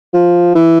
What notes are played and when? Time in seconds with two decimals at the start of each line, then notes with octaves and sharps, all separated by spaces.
0.13 F3
0.55 E3